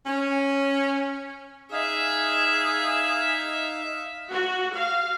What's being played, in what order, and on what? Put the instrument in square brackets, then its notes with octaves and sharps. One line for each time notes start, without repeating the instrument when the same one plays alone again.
[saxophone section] C#4
[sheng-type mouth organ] D#4 F5 [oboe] G#4 [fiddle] E5
[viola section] F#4
F5